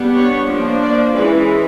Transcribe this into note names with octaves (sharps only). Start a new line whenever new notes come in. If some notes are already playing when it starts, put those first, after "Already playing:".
Already playing: G3 B3 D4
C#5
F3 A#3 D4
D5
E3 G#3 C#4 B4